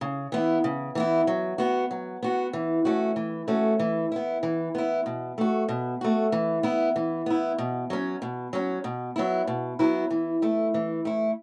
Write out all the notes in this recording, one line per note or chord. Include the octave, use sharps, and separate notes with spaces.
C#3
E3 B3 E4
C#3
E3 B3 E4
F#3
B3 F#4
F#3
B3 F#4
E3
A3 C#4 F#4
E3
A3 C#4 F#4
E3
B3 E4
E3
B3 E4
B2
A3 F#4
B2
A3 F#4
E3
B3 E4
E3
B3 E4
B2
F#3 C#4
B2
F#3 C#4
B2
F#3 B3 E4
B2
F#3 B3 E4
E3
A3 E4
E3
A3 E4